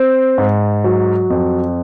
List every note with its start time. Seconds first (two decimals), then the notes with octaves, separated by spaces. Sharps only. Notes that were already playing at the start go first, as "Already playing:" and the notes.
Already playing: C4
0.38 G#2
0.84 F#3
1.30 F2